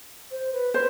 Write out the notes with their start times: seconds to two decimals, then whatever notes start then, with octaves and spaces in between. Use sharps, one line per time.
0.31 C5
0.52 B4
0.74 B4 C5